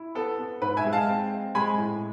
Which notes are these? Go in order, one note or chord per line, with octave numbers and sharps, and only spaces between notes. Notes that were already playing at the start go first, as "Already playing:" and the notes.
Already playing: E4
B3 A4
B3
G#2 B4
E5 G#5
G#3
F5 A5
C4
C4
G#3 G#5 B5
A2